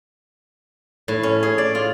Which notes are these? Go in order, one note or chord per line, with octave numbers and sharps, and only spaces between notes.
A2
C#4
G#4
D5
F4